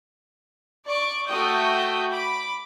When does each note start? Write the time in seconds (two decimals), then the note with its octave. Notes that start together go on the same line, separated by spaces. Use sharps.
0.85 D5 C#6 D6
1.27 A3 F#4 G5 D#6 G6
2.11 B5 D6